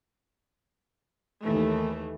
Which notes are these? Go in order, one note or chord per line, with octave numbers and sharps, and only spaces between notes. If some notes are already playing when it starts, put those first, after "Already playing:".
D#2 E3 A3